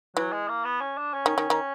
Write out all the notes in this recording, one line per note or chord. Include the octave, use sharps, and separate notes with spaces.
E3 F#3
G#3
A#3
B3
C#4
D4
C#4
D#3
D#3
D#3